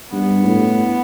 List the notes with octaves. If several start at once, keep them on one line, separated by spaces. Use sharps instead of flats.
G2 B3
A2